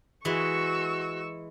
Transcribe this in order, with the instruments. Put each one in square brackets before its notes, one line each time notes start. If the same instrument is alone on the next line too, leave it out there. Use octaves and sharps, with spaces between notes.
[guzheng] E3 G#3 [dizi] F#4 [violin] C#6 E6